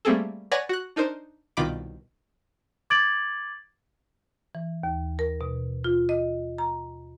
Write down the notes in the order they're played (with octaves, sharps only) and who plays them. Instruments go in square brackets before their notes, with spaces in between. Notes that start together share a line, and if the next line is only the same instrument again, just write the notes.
[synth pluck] G3 A3 A#3 C4 G#4 A4
B4 C#5 D5 F#5 G#5 A#6
F#4 F#6
D4 D#4 A#4 C5
C2 B2 D#3 F4 B5 D6
[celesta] D6 G#6 A6 D7 F#7
[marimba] E3
D#2
A#4
B2
F4
D#5
A#5